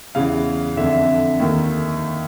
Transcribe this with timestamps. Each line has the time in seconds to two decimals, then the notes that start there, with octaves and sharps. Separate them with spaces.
0.15 E2 C#3 E3 F5
0.77 F2 D3 E5
1.40 D#2 D#3